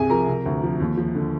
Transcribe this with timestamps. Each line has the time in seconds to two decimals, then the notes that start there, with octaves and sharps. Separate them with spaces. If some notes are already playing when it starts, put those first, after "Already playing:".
Already playing: C2 C3 G#4 G#5
0.10 F3 A#4 A#5
0.28 C3
0.45 D2
0.63 F3
0.80 D#2
0.97 F3
1.15 D3